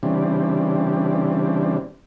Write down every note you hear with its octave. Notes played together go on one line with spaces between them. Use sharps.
C#3 E3 G3 C4 D4